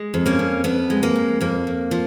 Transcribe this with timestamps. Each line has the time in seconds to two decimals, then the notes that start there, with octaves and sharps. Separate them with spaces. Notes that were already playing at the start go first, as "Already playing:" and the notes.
Already playing: G#3
0.14 F2
0.26 A#3 C#4
0.39 F2
0.64 F2 B3
0.90 G#3
1.03 A#3
1.16 F2
1.41 F2 A#3
1.67 F2
1.91 F3